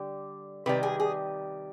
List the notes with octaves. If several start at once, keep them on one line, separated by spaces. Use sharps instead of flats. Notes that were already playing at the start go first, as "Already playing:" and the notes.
Already playing: D3 G3
C3 D#3 G3 B4
G#4
G#4